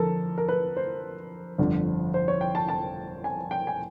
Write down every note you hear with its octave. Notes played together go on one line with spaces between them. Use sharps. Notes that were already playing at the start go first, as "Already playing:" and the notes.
Already playing: F2 D3 A4 A#4
A#4
B4
C5
G1 F2 D3
C5
C#5
G5
A5
A5
G#5
G5
G#5